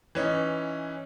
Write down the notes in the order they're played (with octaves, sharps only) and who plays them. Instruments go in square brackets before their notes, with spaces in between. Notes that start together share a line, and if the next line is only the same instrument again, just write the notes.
[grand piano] E3 C#4 D#4